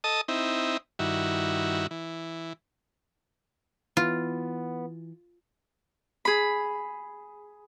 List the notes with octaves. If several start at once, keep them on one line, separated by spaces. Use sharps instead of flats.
A4 D#5 A5 D#6
C4 D#4 E4
G2 D#3 E4 F#4
E3
E3 B3 F4
G#4 B5